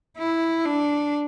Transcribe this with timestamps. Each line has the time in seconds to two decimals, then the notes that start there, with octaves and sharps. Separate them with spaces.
0.18 E4
0.65 D4